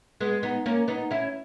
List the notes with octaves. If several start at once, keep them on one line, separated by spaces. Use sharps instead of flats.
G#3 B3
B3 D#4
A#3 C#4
B3 D#4
C#4 E4